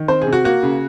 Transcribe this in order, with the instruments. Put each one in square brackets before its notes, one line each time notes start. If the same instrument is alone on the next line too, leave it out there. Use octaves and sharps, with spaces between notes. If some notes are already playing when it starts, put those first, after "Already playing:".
Already playing: [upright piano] D#3
C4 C5
G#4
C3
F#4
A#3 F#4
C#3